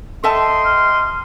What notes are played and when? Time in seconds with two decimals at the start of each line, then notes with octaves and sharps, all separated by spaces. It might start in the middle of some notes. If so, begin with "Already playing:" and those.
0.24 A4 D#5 E5 G5 A5 C6
0.65 F6